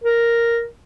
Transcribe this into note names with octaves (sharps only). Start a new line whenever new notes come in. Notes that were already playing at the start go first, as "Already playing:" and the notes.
A#4